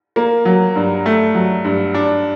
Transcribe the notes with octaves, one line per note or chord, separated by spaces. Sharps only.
A#3
F#3
G2
A3
F#3
G2
D4